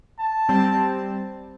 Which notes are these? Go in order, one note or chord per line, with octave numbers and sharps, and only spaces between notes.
A5
G3 C4